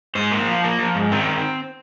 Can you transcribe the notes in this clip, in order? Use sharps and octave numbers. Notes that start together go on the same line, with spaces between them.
G#2 C5
A#3
F3
A#3
F3
G#2
D#3 C4